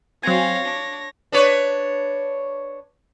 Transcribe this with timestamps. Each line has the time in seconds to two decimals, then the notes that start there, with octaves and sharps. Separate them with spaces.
0.23 F#3 C4 C#5 F5 G#5 A#6
0.65 D4
1.32 D4 B4 C#5